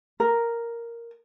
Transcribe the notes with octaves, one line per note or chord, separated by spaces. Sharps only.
A#4